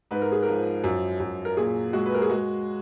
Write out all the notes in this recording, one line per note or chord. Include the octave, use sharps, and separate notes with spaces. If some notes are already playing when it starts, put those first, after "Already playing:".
G#2 B4
A#4
G#4
A#4
F3
F#2
F#2
A#4
A#2 G#4
G#3 F#4
B4
A#4
G#4
G#3 F#4